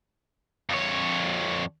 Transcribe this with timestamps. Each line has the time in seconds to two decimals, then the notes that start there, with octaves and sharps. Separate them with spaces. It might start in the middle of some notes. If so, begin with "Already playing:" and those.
0.69 F2 C#5